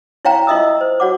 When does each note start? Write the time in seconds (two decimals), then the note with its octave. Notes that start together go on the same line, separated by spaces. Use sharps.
0.25 E4 C#5 F5 G5 A#5
0.47 E4 F4 D#5 E5 D#6 E6
0.81 C5
1.00 F#4 C#5 F#5 D6